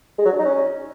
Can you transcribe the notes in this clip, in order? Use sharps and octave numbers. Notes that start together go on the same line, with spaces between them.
G#3
F#3
D4
D#4
C#4